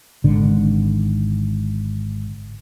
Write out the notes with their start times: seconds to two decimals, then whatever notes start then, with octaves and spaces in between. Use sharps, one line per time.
0.24 G#1 D3